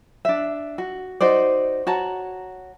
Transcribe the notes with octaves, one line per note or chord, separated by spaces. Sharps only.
D4 E5
F#4
D#4 F#4 C5 D5
F#4 C#5 A5 A#5